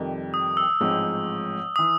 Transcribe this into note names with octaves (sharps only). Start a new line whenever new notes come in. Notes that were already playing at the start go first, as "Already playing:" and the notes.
Already playing: F2 C3 D#3 G3
D#6
E6
A1 G#2 F3 G#3 C4
E3 D#6